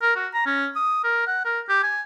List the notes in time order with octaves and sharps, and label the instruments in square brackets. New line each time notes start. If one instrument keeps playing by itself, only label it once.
[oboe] A#4
F#4
A#5
C#4
D#6
A#4
F#5
A#4
G4
G#5